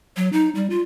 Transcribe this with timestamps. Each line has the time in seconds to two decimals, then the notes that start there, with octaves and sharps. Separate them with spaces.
0.16 F#3
0.32 D#4
0.55 G3
0.70 F4